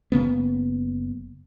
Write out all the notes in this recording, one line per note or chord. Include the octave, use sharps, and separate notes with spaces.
F#1 C#3 A#3 B3